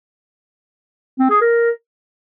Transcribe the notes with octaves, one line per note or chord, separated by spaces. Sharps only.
C4
G#4
A#4